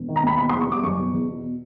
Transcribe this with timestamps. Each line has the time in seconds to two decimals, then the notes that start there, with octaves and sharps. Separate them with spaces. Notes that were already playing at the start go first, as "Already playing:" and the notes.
Already playing: E1
0.08 D#3
0.16 A#5
0.23 D#2 B5
0.38 B2 B5
0.49 C6
0.53 E2
0.60 C#6
0.68 G3 D6
0.83 F#1 C#6
0.98 B2
1.13 E2
1.29 B2